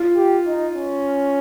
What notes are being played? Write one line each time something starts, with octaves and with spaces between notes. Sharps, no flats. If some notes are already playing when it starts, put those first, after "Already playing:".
Already playing: F4
G4
D#4
C#4